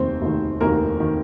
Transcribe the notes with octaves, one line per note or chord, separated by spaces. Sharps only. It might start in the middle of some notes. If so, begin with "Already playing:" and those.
Already playing: F1 D#2 D#3 C4 C5
F1 D#2 D#3
F1 D#2 D#3 A#3 A#4
D#3